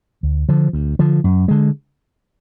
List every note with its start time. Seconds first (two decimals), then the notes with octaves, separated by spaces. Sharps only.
0.23 D2
0.49 D3 F3
0.73 D2
0.99 D3 F3
1.24 F#2
1.48 D3 G#3